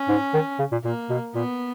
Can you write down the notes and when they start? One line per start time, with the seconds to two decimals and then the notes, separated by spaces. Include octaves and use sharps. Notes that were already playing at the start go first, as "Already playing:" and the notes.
Already playing: C#4
0.08 G#2
0.34 D#3
0.59 C#3
0.72 A#2
0.84 A#2 A#3
1.10 B2
1.35 A#2 B3